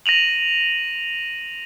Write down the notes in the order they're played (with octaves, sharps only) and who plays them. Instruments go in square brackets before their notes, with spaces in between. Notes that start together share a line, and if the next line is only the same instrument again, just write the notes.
[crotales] A#6 D#7 F7 F#7